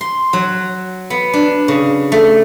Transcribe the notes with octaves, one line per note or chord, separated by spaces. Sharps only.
C6
F#3
B3
D4
C#3
A3